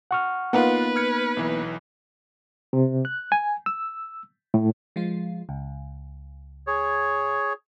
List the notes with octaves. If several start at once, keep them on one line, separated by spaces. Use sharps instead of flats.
F#5 C#6 F6
A#3 B3 D#4 F4 B4 F5 F#5
F6 G#6 C#7
B1 E3
C3
F#6
G#5
E6
A2
F3 G#3 F4
C#2
G#4 C#5